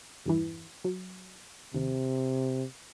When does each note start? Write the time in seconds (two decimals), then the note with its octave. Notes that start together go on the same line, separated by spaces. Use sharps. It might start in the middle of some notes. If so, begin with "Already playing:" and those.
0.26 E2 G2 E3
0.84 F#3
1.74 D#2 C3